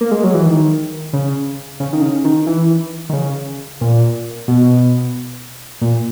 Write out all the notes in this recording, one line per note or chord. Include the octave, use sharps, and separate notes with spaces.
A#3
G#3
F#3
E3
D#3
C#3
C#3
D#3
C#3
D#3
E3
D#3
C#3
A#2
B2
A#2